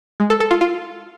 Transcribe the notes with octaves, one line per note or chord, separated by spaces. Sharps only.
G#3
A4
A4
F4
F4